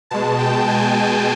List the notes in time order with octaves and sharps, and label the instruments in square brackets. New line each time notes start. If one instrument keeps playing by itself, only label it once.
[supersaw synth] B2 G#3 A5
G5
G#5
G5